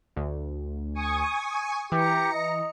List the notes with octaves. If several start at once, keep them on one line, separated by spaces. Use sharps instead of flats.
D2
G#5 C#6 D#6
E3 G4 A#5 C#7
D#5